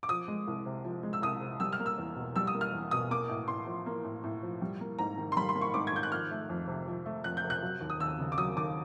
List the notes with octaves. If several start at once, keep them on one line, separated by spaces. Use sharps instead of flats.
D6
F3 D#6
G#3
C2
C3
F3
G#3
E6
C2 D#6
C3
G3 E6
F6
A#3
E6
E2
B2
G3 E6
D#6
A#3
F6
E2
B2 D#6
A#3 D6
A2
A2 C6
F3
A#3
A2
A2
F3
G3
A#3
G#2 A#5
D#3
C6
G3 B5
C6
A#3
C#6
G#2 D6
G#6
D#3 G6
F#6
F3 F6
A3
F2
C3
F3
A3
F2 F#6
G6
C3
F#6
F#3
D#2
D#6
D#2 E6
C#3
D6
F#3 D#6
D#2 D6